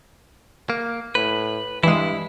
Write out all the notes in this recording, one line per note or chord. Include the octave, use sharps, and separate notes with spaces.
A#3
A2 B4
G2 E3 G#3 E4